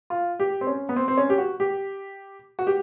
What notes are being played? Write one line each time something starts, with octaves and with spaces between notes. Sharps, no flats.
F4
G4
C4
C#4
B3
C4
C4
C#4
G4
F#4
G4
F#4
G4